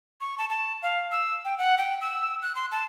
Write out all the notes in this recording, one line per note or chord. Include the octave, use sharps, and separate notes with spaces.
C#6
A5
A5
F5
E6
G5
F#5
G5
E6
F#6
C6
A5